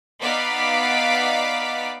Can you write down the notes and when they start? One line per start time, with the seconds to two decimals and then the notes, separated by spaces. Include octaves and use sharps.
0.21 B3 D#4 D5 F5 D6 B6